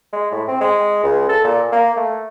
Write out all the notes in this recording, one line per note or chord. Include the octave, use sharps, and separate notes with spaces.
G#3
A2
C4
G#3
C#2
A4
A#2
A#3
A3